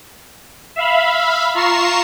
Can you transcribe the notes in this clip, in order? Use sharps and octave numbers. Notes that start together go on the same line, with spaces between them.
E5 F5 B5
F4 A#5 C#6 C7 E7